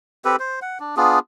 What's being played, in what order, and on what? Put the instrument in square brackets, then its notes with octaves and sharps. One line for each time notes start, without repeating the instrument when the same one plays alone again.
[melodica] C4 G4 A4 B4
C5
F#5
D4
B3 D4 F4 G#4